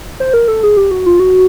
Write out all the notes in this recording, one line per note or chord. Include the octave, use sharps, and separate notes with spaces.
C5
A#4
A4
G#4
G4
F#4
F4
F#4